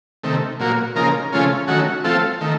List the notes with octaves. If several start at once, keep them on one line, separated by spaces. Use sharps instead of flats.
C3 D#3 A3
A#2 F#3 A#3
C#3 F3 A#3 D#4 A#4
C#3 F3 A3 C#4 F4
D#3 F#3 A3 C#4 F#4
F3 A3 C4 F4 A4
D#3 A3